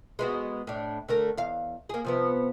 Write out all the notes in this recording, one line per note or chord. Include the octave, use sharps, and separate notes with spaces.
G#3 B3 F#4
A2 D4
D3 A3 A#4
E2 F5
A#3 G#4
C3 F3 B3